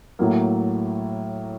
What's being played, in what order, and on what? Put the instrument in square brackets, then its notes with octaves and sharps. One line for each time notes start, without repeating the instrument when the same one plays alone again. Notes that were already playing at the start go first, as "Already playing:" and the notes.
[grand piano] A2 F#3 A#3